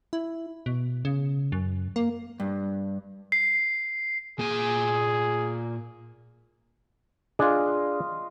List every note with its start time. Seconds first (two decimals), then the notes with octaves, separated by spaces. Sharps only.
0.13 E4
0.66 B2
1.05 C#3
1.52 F#2
1.96 A#3
2.40 G2
3.32 C7
4.39 A#2 G#4 G#5
7.39 D4 F4 G#4 D#5